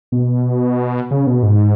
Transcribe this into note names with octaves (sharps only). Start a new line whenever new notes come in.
B2
C#3
B2
G#2